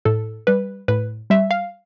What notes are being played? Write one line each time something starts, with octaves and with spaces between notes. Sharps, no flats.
A2 A4
G3 B4
A2 B4
G3 E5
F5